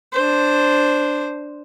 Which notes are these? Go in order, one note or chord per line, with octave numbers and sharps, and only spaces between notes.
D4 C5